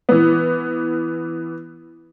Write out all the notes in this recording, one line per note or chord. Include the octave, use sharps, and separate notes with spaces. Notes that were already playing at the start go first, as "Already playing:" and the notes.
E3 B3